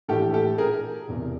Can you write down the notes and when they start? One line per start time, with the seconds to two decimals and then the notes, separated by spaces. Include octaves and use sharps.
0.08 A#1 A2 E3 G4 A4
0.34 G4 A4
0.58 G#4 A#4
1.08 E1 E2 C3